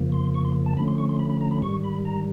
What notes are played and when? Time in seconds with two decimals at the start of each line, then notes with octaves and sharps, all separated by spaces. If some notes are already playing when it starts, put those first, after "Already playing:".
Already playing: F2 C#3 F3 A#3
0.12 C6
0.34 C#6
0.45 C6
0.66 A5
0.77 D3 F3 A3 C#4 B5
0.88 C6
0.98 C#6
1.09 C6
1.19 B5
1.30 B5
1.41 A#5
1.51 B5
1.62 G#2 D#3 G3 C#6
1.84 B5
2.05 A#5